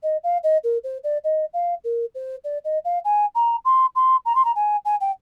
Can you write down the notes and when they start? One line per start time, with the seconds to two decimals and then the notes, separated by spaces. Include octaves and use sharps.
0.03 D#5
0.23 F5
0.43 D#5
0.64 A#4
0.84 C5
1.03 D5
1.24 D#5
1.53 F5
1.84 A#4
2.15 C5
2.44 D5
2.64 D#5
2.85 F5
3.05 G#5
3.35 A#5
3.65 C6
3.95 C6
4.25 A#5
4.35 C6
4.45 A#5
4.55 G#5
4.85 G#5
5.01 G5